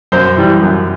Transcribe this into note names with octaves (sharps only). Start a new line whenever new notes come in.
F#2 C5
E3 G3
F#2